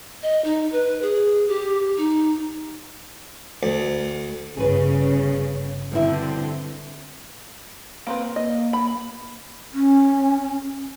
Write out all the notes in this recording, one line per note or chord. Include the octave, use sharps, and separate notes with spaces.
D#5
D#4
B4
G#4
G4
D#4
D2
G1 C#3 G#4 B4
G2 B2 D3 C4 E4
A#3 C4 B4
A#3 D#5
B5
C#4